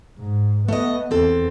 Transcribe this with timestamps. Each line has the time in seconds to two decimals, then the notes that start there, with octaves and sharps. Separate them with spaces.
0.18 G#2
0.68 A3 B3 D#5
1.11 E2 C4 A4